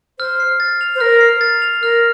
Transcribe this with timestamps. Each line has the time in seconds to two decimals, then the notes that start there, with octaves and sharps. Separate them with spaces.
0.19 C5 F6
0.40 C7
0.60 A6
0.81 F7
0.95 C5
1.00 A#4 F6
1.21 C7
1.41 A6
1.62 F7
1.82 A#4 F6